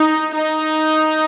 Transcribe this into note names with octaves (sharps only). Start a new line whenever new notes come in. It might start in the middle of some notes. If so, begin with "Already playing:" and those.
Already playing: D#4
D#4